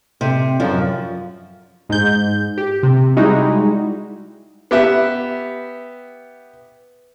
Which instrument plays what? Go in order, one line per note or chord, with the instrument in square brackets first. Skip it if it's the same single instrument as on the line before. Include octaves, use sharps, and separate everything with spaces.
[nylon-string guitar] C3
F#2 F3
[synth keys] G#2 G6
G4
C3
G3 G#3 D#4 E4 F#4
[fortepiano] B3 G4 E5